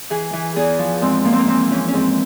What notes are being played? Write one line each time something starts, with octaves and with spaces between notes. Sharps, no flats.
E3 G#4
E3
E2 G#4
F3
G#2 C4
F3 A#3
C4
A#3
E3 C4
E3 C#4
C#4
G#2 C4